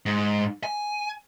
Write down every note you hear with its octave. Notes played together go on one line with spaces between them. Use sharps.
G#2
G#5